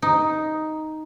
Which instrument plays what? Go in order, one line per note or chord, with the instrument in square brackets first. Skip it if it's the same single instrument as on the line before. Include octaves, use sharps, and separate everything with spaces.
[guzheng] D#4